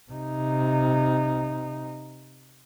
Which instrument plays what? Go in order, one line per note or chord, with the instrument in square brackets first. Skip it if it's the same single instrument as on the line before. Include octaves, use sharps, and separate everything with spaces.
[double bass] C3 D#4